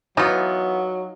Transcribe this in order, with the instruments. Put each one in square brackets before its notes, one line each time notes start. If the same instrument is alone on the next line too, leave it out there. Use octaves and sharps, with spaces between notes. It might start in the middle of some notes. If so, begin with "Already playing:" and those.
[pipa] E3 B3 [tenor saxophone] F#3 [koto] D#4 F4